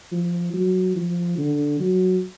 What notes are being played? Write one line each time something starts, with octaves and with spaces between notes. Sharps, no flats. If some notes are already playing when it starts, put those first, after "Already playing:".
F3
F#3
F3
D3
F#3